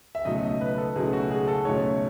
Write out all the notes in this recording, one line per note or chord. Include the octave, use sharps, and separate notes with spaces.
E5
C#2 B2 F#3 A3 D#4 D#5
D#5
B4
A4
C#2 B2 F#3 A3 D#4 G#4
F#4
G#4
A4
C#2 B2 F#3 A3 D#4 C#5